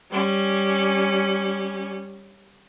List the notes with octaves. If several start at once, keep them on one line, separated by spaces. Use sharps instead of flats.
G3 C#4